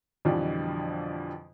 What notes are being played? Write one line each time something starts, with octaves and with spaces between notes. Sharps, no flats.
F2 B2 D3 E3 F3 G3